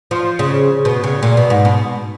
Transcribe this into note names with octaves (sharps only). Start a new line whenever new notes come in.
F3
C#3
B2
C#3
A#2
B2
G#2
B2